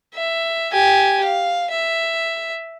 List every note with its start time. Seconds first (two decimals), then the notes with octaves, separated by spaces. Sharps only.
0.15 E5
0.72 G4 G#5
1.24 F5
1.70 E5